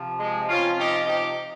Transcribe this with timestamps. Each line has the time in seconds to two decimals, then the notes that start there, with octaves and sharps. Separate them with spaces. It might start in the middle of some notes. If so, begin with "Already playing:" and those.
Already playing: C3 F3
0.20 G#3
0.49 C3 F3 C#4 F4
0.78 D#4 G4
1.07 D#4 G4